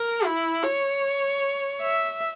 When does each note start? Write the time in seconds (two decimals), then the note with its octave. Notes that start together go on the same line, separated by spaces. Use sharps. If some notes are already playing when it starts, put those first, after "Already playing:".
Already playing: A#4
0.25 E4
0.63 C#5
1.83 E5